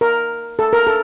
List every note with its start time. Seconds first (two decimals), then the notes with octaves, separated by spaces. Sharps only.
0.01 A#4
0.59 A4
0.73 A#4
0.87 A4